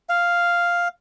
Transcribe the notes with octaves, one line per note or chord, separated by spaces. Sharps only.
F5